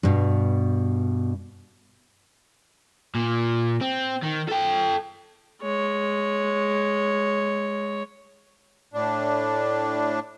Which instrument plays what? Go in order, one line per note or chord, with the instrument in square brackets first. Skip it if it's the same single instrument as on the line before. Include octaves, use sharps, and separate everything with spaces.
[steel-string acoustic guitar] G2 B2
[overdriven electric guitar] A#2
C4
D#3
A4 G5
[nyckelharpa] G#3 C#5
[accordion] A2 D4